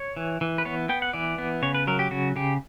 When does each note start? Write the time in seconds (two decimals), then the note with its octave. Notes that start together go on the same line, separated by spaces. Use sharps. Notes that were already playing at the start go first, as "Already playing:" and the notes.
Already playing: C#5
0.17 E3
0.41 E3
0.58 B4
0.65 B3 C#5
0.89 B3 G5
1.02 F#5
1.13 E3 D5
1.38 B3
1.62 C#3 C#5
1.75 B4
1.87 F#3 A#4
1.99 G4
2.11 C#3 F#4
2.36 C#3 G4